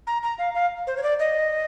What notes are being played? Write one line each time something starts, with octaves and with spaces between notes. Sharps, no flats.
A#5
A#5
F5
F5
C5
C#5
D5
D#5